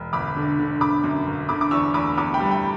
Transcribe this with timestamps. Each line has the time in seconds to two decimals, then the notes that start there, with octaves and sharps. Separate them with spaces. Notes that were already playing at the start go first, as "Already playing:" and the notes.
Already playing: E1
0.13 G1 B5 D6
0.36 D3
0.59 D3
0.81 D3 B5 D6
1.04 F#2
1.27 G1
1.49 D3 B5 D6
1.61 D6
1.71 E2 C#6 E6
1.94 E2 B5 D6
2.17 E2 B5 D6
2.34 G5 B5
2.40 G3
2.50 G5 B5